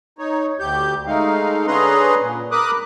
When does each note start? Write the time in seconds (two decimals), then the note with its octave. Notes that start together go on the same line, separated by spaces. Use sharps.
0.19 D#4 C#5
0.59 D2 G4 G6
1.07 G#3 A3 D#4 F5
1.67 D3 C#4 G#4 B4 A#5 C6
2.21 A#2
2.52 A#4 B5 D6 D#6 F#6